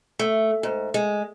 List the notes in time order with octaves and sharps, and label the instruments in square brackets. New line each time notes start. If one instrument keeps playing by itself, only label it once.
[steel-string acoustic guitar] A3
G#2
G#3